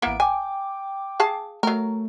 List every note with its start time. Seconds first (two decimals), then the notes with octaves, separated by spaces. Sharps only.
0.02 A1 A#3 B3 E4 D7
0.20 G5 G#5 D6
1.20 G#4 F5 A5
1.63 F#3 A3 A#4